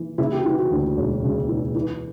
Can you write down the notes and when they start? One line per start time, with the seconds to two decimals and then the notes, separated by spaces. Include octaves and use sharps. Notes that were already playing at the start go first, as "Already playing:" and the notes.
Already playing: E3
0.18 C#3 E4
0.33 G4
0.38 F#4
0.45 E3
0.58 F#4
0.71 D2
0.97 E1
1.23 C#3
1.48 E3
1.75 E3